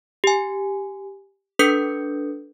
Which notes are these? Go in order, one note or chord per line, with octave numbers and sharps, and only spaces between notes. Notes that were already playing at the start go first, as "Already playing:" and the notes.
G4 G#5
D4 A4 B4 D#6 G6 C#7